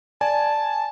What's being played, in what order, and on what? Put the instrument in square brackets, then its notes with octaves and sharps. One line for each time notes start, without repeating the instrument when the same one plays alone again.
[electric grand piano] D5 G#5 [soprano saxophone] A5